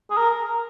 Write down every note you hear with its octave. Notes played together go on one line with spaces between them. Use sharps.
G#4
A#4